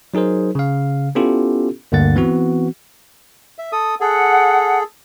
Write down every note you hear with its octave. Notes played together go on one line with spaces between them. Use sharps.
F#3 D#4 G#4 A#4 C5
C#3 F5
B3 C#4 E4 F4 G4 A4
D2 G2 D3 A#3 F#5 A6
E3 B3 C4 F#4
E5
A4 D#6
G#4 A4 F#5